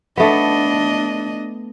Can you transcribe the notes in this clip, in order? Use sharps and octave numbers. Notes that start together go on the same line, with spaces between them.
A3 B3 D4 D#5